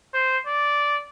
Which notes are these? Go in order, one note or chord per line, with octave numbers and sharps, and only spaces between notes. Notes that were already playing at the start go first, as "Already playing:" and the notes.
C5
D5